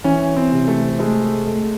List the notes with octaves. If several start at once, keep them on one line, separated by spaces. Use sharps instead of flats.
E3 C#4
C4
C3
A3
G#3 A3
A3